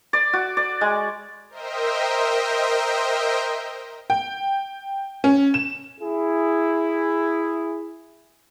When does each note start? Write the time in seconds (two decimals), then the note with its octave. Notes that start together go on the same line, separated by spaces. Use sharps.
0.13 D5
0.33 F#4
0.57 D5
0.81 G#3
1.49 A#4 C5 D#5 E5 G5
4.10 G5
5.24 C#4
5.54 E7
6.01 E4 G#4